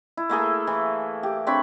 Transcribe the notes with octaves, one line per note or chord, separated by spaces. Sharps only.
E4
A3 A#3 G#4 A4
E3
G4
C4 D4 C#5 B5